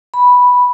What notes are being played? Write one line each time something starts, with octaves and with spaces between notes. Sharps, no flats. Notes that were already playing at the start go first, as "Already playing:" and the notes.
B5